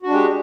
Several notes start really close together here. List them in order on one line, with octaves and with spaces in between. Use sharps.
F#4 D4 G#3 G4